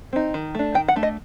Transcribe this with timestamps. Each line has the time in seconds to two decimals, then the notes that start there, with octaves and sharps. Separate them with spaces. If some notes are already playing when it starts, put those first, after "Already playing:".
0.13 C4 D#4
0.34 D#3
0.55 A3 D4
0.74 D#3 G5
0.88 F#5
0.96 A3 D4
1.03 D#5